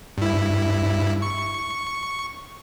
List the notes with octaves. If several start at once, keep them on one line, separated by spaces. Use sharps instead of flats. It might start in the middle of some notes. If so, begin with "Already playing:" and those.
G2 E4
C#6